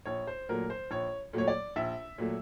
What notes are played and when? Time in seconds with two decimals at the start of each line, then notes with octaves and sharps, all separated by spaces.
0.05 A#1 C#5
0.27 C5
0.49 A#2 F#3 A3 A#4
0.70 C5
0.91 A#1 C#5
1.33 A#2 F#3 A3 C#5
1.48 D5
1.76 A#1 E5
2.18 A#2 F#3 A3